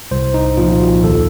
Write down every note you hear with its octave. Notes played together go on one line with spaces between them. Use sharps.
C2 C5
D#4
A#2 F3 F4
F#4
D#2 A4